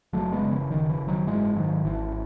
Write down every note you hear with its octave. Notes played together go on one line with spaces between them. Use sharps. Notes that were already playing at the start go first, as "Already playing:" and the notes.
F#1 F#3 A3
G#3 B3
C#3
E3
F#1 D#3
E3
F#1
D#3 F#3
G#2 E3 G#3
G#2 D#3 F#3
G#1 E3